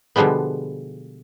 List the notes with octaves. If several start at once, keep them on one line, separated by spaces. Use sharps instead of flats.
B2 D3 F3 G3 G#3 B3